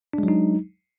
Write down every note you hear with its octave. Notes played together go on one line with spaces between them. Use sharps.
F#3 G#3 D4 D#4